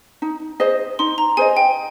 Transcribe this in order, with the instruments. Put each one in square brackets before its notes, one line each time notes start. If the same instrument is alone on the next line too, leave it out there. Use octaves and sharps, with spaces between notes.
[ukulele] D#4
G#4 C5 D#5
[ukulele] D#4 [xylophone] C6
[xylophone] A#5
[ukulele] G#4 C5 D#5 [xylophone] G#5
[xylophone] G5